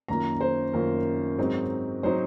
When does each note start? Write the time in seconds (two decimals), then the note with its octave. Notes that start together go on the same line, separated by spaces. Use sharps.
0.08 F#2 D#3 A#3 F4 A#5
0.41 C5
0.73 F#2 D#3 A#3 F4 A#4
1.38 G#2 F#3 C4 D#4
2.03 F#3 C4 D#4 C5